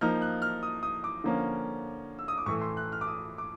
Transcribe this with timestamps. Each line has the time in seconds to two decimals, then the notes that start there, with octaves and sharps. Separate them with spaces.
0.01 F3 A#3 D#4 F6
0.22 F#6
0.42 F6
0.63 D#6
0.83 D#6
1.04 D6
1.24 D3 F3 A#3 C#4
2.19 E6
2.28 D#6
2.38 D6
2.46 A2 E3 A3 C#6
2.61 C6
2.77 F#6
2.92 F6
3.01 D6
3.08 D#6
3.38 D6